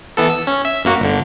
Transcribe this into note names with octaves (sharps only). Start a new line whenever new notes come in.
E3 B3 A4
E6
C#4
E5
F#2 A#3 F#4
G1 D3